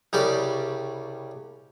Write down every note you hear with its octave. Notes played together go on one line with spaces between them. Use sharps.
C2 C#3 G3 G4 D5 D6